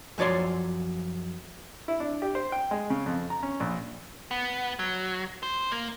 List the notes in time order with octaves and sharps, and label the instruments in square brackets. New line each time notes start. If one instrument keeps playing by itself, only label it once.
[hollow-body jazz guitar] F#2 F3 C#5 D5 C6
[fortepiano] E4
D4
G4
C5
G5
G#3
C#3
F2
A#5
C#4
A#1
[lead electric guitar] B3
F#3
C5
A#3